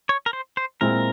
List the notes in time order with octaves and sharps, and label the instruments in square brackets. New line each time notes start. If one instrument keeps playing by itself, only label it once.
[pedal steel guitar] C#5
A#4
C5
C5
[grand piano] A#2 G#3 C4 E4 [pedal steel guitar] A#4